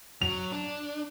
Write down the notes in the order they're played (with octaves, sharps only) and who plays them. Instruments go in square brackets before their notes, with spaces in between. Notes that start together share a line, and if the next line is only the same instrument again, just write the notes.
[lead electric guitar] F#3 [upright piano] F7
[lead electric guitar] D4